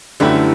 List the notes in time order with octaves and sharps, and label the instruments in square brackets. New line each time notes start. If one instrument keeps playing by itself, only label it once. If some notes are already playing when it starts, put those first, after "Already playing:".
[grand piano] F#2 D3 A3 E4 G4 [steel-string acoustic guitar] E3 G3